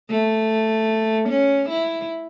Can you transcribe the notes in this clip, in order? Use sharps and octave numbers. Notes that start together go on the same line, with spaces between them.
A3
C#4
E4